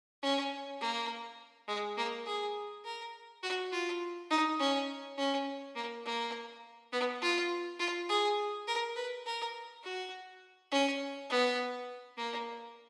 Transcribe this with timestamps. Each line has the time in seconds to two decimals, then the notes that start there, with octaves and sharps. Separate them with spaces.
0.23 C#4
0.81 A#3
1.68 G#3
1.97 A#3
2.26 G#4
2.85 A#4
3.43 F#4
3.72 F4
4.31 D#4
4.60 C#4
5.18 C#4
5.76 A#3
6.05 A#3
6.93 B3
7.22 F4
7.80 F4
8.09 G#4
8.67 A#4
8.96 B4
9.26 A#4
9.84 F#4
10.72 C#4
11.30 B3
12.17 A#3